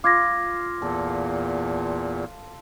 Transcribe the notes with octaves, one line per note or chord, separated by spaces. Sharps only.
F4 D6 G#6 A#6
E2 A#2 A4